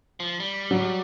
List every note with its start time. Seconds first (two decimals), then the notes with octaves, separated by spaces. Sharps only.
0.20 F3
0.40 G3
0.71 F#3